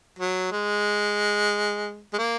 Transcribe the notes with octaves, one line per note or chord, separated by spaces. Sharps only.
F#3
G#3
G#3
A#3